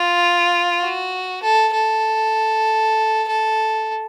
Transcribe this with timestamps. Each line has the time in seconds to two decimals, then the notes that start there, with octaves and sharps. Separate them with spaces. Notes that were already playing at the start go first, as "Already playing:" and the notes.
Already playing: F4
0.81 F#4
1.43 A4
1.73 A4
3.28 A4